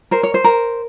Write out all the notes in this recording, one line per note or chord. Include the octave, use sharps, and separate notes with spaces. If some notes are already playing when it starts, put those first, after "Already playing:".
A#4 C5
C#5
C5
A#4